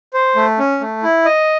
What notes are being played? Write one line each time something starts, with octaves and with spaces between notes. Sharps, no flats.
C5
A3
C#4
A3
E4
D#5